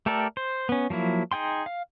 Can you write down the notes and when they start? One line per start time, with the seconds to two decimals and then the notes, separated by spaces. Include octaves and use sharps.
0.06 A3 G4 A4 A#4 D5
0.37 C5
0.69 B3 C#4
0.90 F3 F#3 A#3 E4
1.32 D#4 G#4 G5 C6
1.66 F5